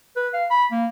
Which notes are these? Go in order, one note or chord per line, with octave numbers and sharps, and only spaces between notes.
B4
F5
B5
A#3